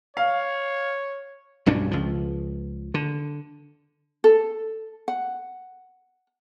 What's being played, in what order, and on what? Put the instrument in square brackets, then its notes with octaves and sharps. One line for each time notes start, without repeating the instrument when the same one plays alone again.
[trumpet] C#5 [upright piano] F5
[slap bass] B1 G2 C#4 D4
C#2 F3
D3
[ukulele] A4
F#5